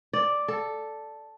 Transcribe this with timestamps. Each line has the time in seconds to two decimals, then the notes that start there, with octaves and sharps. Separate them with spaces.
0.13 D5
0.48 A4